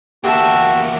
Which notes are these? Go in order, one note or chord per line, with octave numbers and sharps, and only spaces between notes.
E2 A#3 F#4 G4 E5 A5